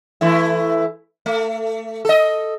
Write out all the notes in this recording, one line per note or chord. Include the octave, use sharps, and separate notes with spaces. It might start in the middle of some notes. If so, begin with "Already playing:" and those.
E3 A3 E4
A3
A4 D#5